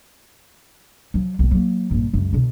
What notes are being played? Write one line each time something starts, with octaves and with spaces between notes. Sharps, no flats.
F3 F#3
B1 C4
F#3 A#3
A#1 G2
C#2 F#2
B2 D3